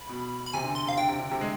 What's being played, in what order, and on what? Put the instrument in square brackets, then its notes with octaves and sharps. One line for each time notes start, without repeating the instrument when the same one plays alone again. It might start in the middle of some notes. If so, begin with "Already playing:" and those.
Already playing: [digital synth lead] B5
[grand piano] B2
[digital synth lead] B5
[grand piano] C3 [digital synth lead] G#5
[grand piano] D3
[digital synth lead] C6
[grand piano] C3 [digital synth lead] F5
[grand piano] D3 [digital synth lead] G5
[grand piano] C3
D3
C3
G#3